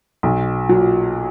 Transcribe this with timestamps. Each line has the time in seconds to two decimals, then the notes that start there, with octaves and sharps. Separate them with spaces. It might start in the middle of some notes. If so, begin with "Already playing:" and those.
0.23 B1
0.69 A#2 F#3